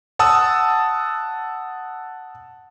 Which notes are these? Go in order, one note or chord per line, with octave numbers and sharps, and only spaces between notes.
F#5 A5 D#6 E6